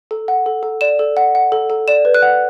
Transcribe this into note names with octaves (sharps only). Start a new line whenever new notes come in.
A4
F#5
A4
A4
D5 E7
A4
F#5
F#5
A4
A4
D5 E7
B4
F#6
F#5